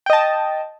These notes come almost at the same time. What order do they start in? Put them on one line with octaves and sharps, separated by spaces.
G5 D#5 A5